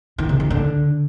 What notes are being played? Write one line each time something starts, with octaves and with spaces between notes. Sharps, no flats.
D#3
C3
D#3
D3